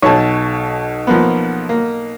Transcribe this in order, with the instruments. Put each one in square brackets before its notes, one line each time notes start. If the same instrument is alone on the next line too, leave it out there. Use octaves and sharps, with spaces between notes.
[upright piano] B1 B2 [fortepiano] C#5 A5
[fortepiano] F3 A#3 B3
A#3